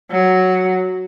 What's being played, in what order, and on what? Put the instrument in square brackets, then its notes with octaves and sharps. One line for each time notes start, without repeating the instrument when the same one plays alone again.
[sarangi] F#3